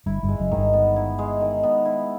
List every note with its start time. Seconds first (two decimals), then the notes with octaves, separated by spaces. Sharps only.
0.06 G1 G2 E4
0.23 G1 G2
0.29 G#3
0.40 F#1 F#2
0.51 G#2 D#3
0.57 G1 G2
0.73 B3
0.96 E4
1.19 G#3
1.41 D#3
1.63 B3
1.85 E4